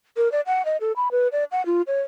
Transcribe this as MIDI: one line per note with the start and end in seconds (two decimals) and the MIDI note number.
0.17 0.31 70
0.32 0.41 74
0.47 0.64 78
0.65 0.77 75
0.81 0.92 69
0.96 1.11 83
1.11 1.28 71
1.32 1.44 74
1.52 1.64 78
1.66 1.82 65
1.87 2.01 73